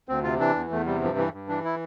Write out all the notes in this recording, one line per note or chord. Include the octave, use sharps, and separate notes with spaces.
D2 C4
C3 F4
E3 D4
E2
E2 A3
C3 G3
G2 F3
E3
G2
E3 D4
E4